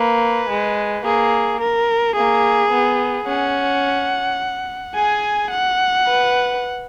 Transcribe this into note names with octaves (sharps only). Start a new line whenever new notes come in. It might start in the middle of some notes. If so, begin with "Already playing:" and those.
Already playing: A#3 B4
G#3
A#3 G#4
A#4
A#3 G#4
B3
C#4 F#5
G#4 G#5
F#5
B4